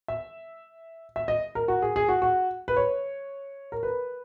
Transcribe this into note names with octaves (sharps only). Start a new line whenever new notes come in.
E5
E5
D#5
A#4
F#4
G#4
G#4
F#4
F#4
B4
C#5
A#4
B4